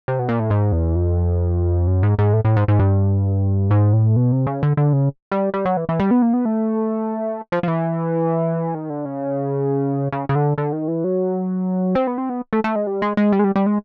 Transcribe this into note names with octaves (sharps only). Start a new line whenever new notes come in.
C3
B2
A#2
A2
G#2
E2
F2
F#2
G#2
G#2
A2
A2
G#2
G#2
G2
G#2
A2
B2
C3
C#3
D3
D3
C#3
G3
G3
F#3
E3
E3
G3
B3
A#3
B3
A3
F3
F3
E3
D#3
D3
C#3
C#3
C#3
D3
D3
D#3
E3
F#3
C4
B3
C4
B3
A3
A3
G#3
G3
G#3
G#3
G3
G#3
G3
G3
G#3